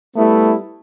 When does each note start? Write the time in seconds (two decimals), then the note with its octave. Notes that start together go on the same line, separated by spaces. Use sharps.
0.16 G3 A3 B3 E4